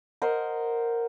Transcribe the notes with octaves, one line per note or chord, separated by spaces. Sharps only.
A#4 C5 D#5 F#5